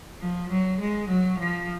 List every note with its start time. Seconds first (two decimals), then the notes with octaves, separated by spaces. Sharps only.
0.20 F3
0.49 F#3
0.80 G#3
1.08 F#3
1.38 F3